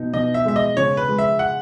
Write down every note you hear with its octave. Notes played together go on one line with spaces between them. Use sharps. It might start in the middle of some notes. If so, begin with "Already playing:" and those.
Already playing: B2 D#4
B2 D#5
E5
G#3 E5
D#5
C#3 C#5
B4
G#3
E5
F#5